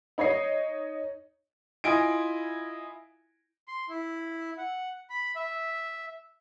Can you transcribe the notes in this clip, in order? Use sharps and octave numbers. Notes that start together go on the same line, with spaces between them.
D#4 C#5 D#5 C7
E4 F4 D#5 G#5 D7
C6
E4
F#5
B5
E5